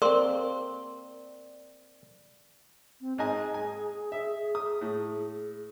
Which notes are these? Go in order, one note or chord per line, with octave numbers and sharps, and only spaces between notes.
A#3 C4 A#4 D5 C6
C4
G#2 G#4 D#5 G#5
G#5
E5
D#6
A2